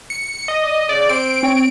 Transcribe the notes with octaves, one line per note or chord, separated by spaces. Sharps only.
C#7
D#5
D5
C#3 D5
C4 D7
C4 C#5